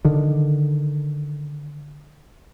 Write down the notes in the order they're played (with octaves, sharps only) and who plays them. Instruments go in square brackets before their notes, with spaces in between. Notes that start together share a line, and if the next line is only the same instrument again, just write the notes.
[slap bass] D3 D#3